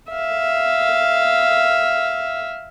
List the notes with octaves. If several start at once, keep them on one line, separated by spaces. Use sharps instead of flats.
E5 F5